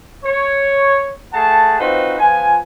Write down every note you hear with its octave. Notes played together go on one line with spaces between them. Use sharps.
C#5
A3 G#4 F#5 A5
C4 D#4 F4 F#4 B4 C5
F3 B3 F4 G#5